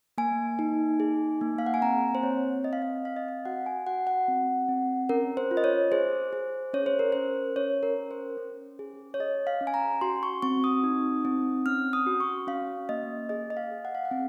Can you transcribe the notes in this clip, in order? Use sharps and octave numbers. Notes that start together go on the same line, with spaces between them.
A#3 G#5
D#4
G#4
A#3
F5
F#5
G#5
C4 A#5
C5
C4 C#5
C4 D#5
F5
D#5
C4 F5
D#5
F5
F#4 F#5
G#5
F#4 F#5
F#5
C4
C4
C#4 A#4
C5
F4
D#5
C#5
G#4 C5
G#4
C#4 C#5
C5
A#4
C#4 C5
C#4 C#5
A#4
C#4
C5
C#4
G#4
C#5
G#4 D#5
F5
C#4
G#5
A#5
F#4 C6
C#6
C4 C#6
D#6
D#4
C4
C#4 F6
D#6
F#4
C#6
C#4 F5
A#3 D#5
G#4 D#5
D#5
F5
G#4
F#5
F5
F#5
C4